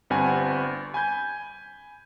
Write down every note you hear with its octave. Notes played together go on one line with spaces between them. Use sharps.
G1 G2 C4 F#5 G#5
G#5 B5 G6 G#6